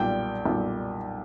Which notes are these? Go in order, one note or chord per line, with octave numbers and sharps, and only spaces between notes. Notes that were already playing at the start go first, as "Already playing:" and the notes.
Already playing: B1 A#2 G3 G5
B1 A#2 G3